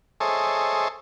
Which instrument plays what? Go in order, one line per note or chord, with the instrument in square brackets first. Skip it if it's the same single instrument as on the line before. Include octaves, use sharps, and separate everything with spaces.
[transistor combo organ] G#4 A4 C5 C#5 D#5 E5